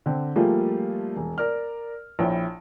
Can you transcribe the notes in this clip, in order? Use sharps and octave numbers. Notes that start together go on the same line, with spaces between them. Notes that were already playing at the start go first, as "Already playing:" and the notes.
D3 C4
F3 G3 A3 A#3 F4 G#4
E1
A#4 D5 F6
A#1 E4 C#5 G5